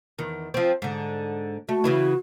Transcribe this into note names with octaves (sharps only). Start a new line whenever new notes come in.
E2 D#3
F3 C4
G#2 D3
A3 F#4
C#3 E3 E4